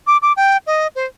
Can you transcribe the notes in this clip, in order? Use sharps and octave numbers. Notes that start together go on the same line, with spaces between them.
D6
D6
G5
D#5
C5